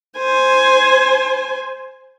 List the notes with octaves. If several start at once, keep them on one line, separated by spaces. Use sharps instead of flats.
C5 G#5